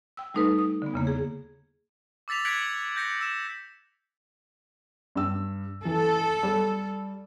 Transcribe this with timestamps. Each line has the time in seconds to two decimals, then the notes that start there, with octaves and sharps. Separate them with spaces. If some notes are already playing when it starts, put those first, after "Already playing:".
0.17 G5 E6
0.34 G3 A3 D#4 A4 B4
0.59 D#6
0.82 D3 B3
0.94 E2 C#3 A#3
1.07 G#4
2.28 D6 E6 A6 B6 F7
2.45 F#6 G#6 B6 C#7 D7 F#7
2.96 G6 A#6 C#7
3.21 E6 E7
5.16 G2 E6
5.85 E3 A4
6.43 G3